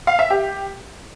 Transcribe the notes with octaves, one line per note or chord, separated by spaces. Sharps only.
F5
E5
G4